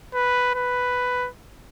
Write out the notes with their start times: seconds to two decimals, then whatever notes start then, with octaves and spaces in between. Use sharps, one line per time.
0.14 B4
0.55 B4